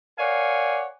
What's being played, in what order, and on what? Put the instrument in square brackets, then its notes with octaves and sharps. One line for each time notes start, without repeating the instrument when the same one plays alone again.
[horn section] A#4 C#5 D5 F5 F#5 G#5